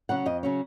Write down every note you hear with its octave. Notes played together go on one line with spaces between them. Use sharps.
C#3 F#3 C#4 F#5
F2 D#5
C#3 F#3 C#4